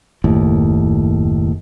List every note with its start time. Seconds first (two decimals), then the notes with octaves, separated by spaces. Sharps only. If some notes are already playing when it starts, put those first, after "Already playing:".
0.24 F#1 D#2 A2